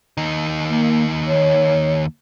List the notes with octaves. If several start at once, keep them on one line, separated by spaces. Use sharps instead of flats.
D#2 D#4
A#3
C#5